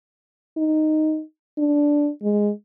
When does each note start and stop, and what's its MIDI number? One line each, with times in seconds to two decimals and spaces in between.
0.57 1.22 63
1.58 2.09 62
2.23 2.51 56